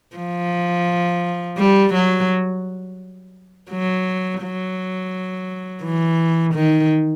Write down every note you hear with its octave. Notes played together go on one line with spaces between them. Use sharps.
F3
G3
F#3
F#3
F#3
E3
D#3